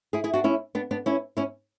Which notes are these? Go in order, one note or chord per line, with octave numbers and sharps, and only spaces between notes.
E4 G#4
E4 G#4
D4 F#4
C#4 E4
B3 D4
B3 D4
C#4 E4
C#4 E4